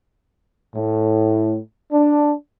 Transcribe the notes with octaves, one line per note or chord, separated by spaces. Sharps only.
A2
D4